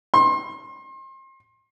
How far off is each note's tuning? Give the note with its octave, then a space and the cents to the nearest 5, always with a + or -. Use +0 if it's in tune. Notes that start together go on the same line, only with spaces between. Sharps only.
C6 +35